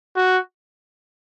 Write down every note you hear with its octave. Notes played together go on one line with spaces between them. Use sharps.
F#4